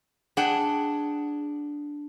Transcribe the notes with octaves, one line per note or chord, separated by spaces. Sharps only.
D4 G#4 F#5 G5